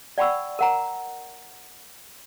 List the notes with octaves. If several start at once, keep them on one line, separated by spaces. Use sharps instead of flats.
D5 F#5 G5 B5 C#6 E6
A#4 F#5 A#5